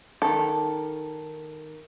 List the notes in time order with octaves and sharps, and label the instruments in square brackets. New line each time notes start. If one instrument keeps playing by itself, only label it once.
[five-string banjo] D#3 A4